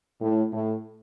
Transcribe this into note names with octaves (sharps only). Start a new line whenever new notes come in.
A2
A2